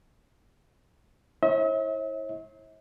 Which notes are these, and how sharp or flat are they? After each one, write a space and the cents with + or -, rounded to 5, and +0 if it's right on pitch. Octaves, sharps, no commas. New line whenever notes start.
E4 -25 C#5 -40 E5 -45